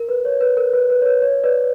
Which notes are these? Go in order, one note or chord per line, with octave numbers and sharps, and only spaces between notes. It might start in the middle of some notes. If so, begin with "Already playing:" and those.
Already playing: A#4
B4
C#5
B4
A#4
B4
B4
C#5
B4
C#5
B4 D5